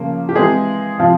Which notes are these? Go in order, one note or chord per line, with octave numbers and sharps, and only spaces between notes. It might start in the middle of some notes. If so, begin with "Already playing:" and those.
Already playing: C#3 F3 A#3
G4
E3 G#3 C4 G#4
C3 F3 C4 F4